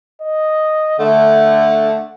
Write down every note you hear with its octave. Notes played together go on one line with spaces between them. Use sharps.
D#5
D3 A3 F#5